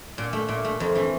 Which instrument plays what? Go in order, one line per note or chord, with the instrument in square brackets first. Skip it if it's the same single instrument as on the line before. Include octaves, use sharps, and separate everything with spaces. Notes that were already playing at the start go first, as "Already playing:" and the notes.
[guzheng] A#2
A3
A#2
A3
F2
E3 A3